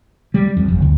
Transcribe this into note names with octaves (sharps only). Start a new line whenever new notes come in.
G3
F2
G1
D2